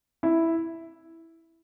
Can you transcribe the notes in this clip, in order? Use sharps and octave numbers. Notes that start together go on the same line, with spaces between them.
E4